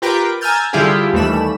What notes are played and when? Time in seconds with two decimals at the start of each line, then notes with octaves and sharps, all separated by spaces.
0.02 F4 G4 A#4 B4 G5 D6
0.41 G#5 A#5 E6 F6 G6 A6
0.73 D3 G3 E4 F4 G4 G#4
1.13 D#2 E3 G3 A3 B5 E7